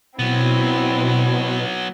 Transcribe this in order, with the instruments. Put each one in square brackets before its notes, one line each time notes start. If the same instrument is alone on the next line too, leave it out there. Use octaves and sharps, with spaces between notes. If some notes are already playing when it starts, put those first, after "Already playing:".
[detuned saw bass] B2 [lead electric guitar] F#3 B3 [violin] C4 E4